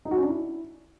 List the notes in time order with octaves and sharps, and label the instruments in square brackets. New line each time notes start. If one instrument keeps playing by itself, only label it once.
[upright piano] D#4
F#4
C#4
D4
E4